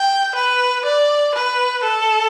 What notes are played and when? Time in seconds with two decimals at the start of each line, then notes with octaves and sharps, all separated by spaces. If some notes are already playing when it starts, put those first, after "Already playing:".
Already playing: G5
0.35 B4
0.85 D5
1.35 B4
1.83 A4